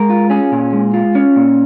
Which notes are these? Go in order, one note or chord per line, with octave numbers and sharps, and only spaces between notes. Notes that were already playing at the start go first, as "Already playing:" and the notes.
Already playing: G#3 A#4
F4
C#4 G#4
A#2
G#3
F4
C#4
A#2